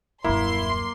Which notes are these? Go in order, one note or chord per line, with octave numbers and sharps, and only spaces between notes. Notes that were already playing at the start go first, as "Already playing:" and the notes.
D#1 F#2 A#3 E4 C6